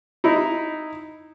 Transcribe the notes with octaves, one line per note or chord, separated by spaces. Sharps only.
D#4 E4